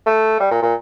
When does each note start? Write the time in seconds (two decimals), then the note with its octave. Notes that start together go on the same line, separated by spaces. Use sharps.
0.06 A3
0.40 G3
0.51 A#2
0.62 A#2